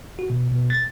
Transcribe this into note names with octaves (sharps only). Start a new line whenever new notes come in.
F#4
B2
B2
A6